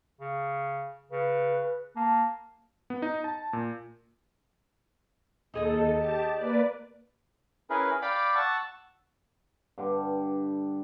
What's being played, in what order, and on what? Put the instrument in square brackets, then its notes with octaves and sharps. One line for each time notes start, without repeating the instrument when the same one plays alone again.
[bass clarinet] C#3
[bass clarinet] C#3 [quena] B4
[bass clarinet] A#3 [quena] A5
[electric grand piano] B3
D#4
A5
A#2
[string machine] D#2 A4 [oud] D#4 G#4 D#5
[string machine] G4 A5
A#3 B4 D5
[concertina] C#4 E4 G#4 A#4 B4
D5 F5 G5 B5 D6
F#5 A5 C#6 E6
[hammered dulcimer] G2 D3 G3